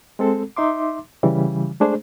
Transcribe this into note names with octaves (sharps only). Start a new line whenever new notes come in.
G#3 C4 A4
D#4 E5 C6 D6
C#3 E3 G3
G#3 A3 D4 G#4 C5